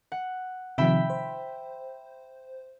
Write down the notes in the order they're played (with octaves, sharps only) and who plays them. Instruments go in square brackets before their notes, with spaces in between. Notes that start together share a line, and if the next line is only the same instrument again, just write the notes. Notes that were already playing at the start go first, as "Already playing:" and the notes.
[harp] F#5
[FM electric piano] C3 D#3 F3 [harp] E5 G5 B5
[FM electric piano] C5